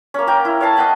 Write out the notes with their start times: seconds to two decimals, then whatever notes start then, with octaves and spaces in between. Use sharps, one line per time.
0.14 A#3 C#4
0.27 A#4 G5
0.45 E4
0.61 C#5 F5 A5
0.76 D#5 F#5 G5 B5